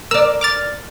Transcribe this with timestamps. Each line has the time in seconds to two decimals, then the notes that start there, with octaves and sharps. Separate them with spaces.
0.11 A#4 D5 E6
0.41 D6 F6 A6